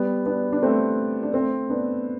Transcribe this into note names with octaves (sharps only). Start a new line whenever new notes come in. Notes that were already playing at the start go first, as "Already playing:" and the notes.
Already playing: G3 B3
B3 D4
D4
A3 C4
D4
A3 C4
B3 D4